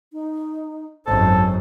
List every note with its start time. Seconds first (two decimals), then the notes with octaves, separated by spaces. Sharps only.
0.13 D#4
1.06 G#1 F#2 A4 C5